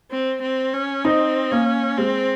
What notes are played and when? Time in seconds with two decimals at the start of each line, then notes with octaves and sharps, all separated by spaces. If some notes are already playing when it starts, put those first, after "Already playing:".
0.11 C4
0.42 C4
0.74 C#4
1.04 C4 D#4
1.52 A#3 C#4
1.98 G#3 C4